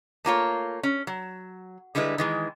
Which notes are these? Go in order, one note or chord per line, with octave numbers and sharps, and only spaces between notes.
A3 A#3 F4 C#5
C#4
F#3
D3 G3 G#3 E4 B4
D#3 E3 G#3